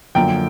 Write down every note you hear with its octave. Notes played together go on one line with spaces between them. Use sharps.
F#2 D3 F3 A#3 G5